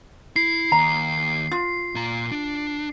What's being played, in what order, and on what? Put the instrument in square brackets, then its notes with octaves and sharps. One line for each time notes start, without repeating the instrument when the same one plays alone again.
[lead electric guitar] E4 [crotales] C7
[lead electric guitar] D#2 [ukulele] A#5
[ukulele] F4
[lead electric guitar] A#2 A#5
D4